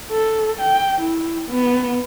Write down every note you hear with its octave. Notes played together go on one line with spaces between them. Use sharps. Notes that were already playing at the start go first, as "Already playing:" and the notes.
A4
G5
E4
B3